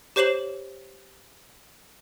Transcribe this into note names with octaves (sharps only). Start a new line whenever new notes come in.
G4 C5 C#5 C7 E7 F#7